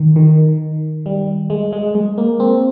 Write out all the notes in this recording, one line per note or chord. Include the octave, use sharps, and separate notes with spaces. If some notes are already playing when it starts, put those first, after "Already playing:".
Already playing: D#3
D#3
G3
G#3
G#3
G#3
A#3
C4